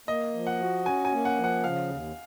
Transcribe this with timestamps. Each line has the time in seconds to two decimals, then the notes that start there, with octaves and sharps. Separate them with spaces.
0.08 A#3 D#5
0.34 F3
0.47 F#5
0.60 F#4
0.85 C#4 G#5
1.05 G#5
1.12 A#3
1.25 F#5
1.37 F3
1.44 F#5
1.64 C#3 F5
1.89 D#2